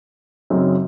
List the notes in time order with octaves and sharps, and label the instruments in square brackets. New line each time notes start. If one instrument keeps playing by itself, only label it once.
[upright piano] F#2 C#3 F#3 C4 D#4